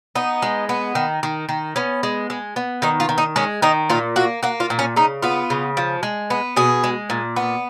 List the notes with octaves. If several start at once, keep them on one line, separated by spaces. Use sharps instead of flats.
B3 D#4
G#3
B3
D#3
D#3
D#3
B3 C#4
G#3
G#3
B3
D#3 D#4
F4
D#3
D#4
G#3 C#4
D#3 D#4
A#2 F4
A#3 F#4
A#3 F#4
F4
A#2
C#4
C#3 D#4
B3 F4
C#3
F3
G#3
B3
B2 G#4
G#3
A#2
B3